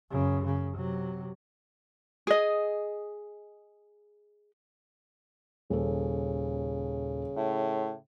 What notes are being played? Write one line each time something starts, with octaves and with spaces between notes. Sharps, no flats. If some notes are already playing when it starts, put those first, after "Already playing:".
F#2 C#3
C#3
C3 F#3
G#4 D#5
D#1 C#3 A4
A2